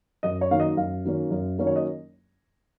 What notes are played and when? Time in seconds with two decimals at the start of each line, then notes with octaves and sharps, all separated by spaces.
0.23 F#2 D#5
0.41 C#5
0.51 D#3 F#3 A#3 C#4 F5
0.60 D#5
0.77 F#2 F5
1.05 D#3 F#3 A#3 C#4
1.31 F#2
1.58 D#3 F#3 A#3 C#4
1.67 C#5
1.76 D#5